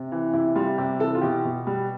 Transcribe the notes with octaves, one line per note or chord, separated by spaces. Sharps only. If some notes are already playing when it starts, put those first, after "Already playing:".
Already playing: C3
E3
C3 E4
G3 F4
C3 G4
E3 A4
F4
B2 G4
B2
G3